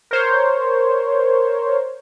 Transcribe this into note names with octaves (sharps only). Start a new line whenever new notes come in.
A#4 C5 C#5